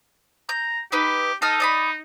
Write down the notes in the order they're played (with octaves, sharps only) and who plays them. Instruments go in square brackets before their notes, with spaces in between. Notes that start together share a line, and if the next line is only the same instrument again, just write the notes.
[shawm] A#5 [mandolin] G6
[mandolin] D#4 B4 [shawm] G4
[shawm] D#4 [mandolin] A4 D#5 F6
[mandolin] D5 D#5 B5